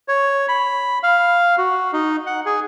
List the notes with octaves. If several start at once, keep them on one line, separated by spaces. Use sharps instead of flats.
C#5
B5
F5
F#4
D#4
F#5
G#4